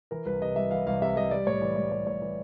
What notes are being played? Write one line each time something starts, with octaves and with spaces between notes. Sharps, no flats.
E3 A#4
C2 B4
C3 D#5
G3 E5
E3 F5
C2 F5
C3 E5
G3 D#5
G3 D5
A2 C#5
E3 D5
A2 D5
G3 C#5
A2 C#5
E3